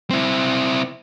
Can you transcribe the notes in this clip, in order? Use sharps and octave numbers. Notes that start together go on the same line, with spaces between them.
C4 E4